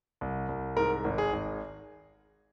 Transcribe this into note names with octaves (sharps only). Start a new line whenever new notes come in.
C2
C2
G#2 A#4
G#1
G#4
G#1